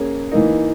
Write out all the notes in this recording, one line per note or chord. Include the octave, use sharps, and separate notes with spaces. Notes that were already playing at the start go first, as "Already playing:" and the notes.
Already playing: A#3 C#4 G#4
E3 A#3 D#4